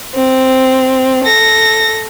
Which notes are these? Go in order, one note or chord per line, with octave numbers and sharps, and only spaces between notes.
C4
A4 A#6